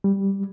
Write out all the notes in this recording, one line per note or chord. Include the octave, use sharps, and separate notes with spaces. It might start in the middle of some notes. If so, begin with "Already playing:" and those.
G3